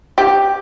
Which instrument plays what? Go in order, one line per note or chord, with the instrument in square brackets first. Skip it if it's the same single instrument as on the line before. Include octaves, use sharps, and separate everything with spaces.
[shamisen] G4